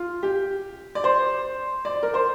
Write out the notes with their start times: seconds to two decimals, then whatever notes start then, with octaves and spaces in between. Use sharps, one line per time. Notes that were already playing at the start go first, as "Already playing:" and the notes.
Already playing: F4
0.23 G4
0.95 D5
1.04 C5
1.85 D5
2.03 A#4
2.14 C5